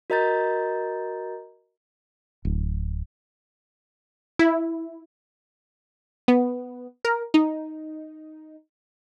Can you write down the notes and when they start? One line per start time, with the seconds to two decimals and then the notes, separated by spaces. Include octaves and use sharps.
0.10 F#4 A#4 D#5 A#5 G6 A6
2.45 D1
4.39 E4
6.28 B3
7.05 A#4
7.34 D#4